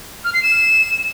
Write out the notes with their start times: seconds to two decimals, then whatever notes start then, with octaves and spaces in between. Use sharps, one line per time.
0.25 F6
0.34 C7
0.43 E7